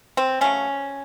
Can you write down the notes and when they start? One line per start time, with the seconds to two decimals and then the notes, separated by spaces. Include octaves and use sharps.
0.17 C4
0.41 C#3 F#3 A3 C#4